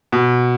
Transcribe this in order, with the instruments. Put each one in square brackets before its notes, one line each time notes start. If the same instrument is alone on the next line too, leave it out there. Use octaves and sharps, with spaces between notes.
[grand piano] B2